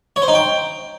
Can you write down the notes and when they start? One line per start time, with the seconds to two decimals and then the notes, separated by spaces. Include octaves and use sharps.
0.16 C#5
0.22 C5
0.28 D#4
0.34 G5